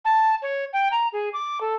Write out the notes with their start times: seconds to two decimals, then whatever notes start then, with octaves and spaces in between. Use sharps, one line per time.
0.05 A5
0.42 C#5
0.73 G5
0.92 A#5
1.13 G#4
1.33 D6
1.61 A4